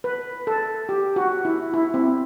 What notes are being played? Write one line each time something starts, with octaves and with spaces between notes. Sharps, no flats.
B4
A4
G4
F#4
E4
E4
C4